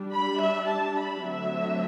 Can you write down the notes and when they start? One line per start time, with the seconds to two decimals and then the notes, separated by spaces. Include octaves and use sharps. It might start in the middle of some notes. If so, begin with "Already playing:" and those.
Already playing: G3 D4
0.11 B5
0.39 E5
0.68 A5
0.97 B5
1.25 D3 F#3 A3 C4 E5